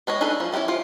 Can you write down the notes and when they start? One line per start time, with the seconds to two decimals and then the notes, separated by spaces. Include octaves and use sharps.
0.07 G#3 B4 C#5 D#5
0.21 D4 D#4 G#4 A4 B4
0.40 F3
0.52 C#4 E4 F4 G4 D5
0.68 F4 C5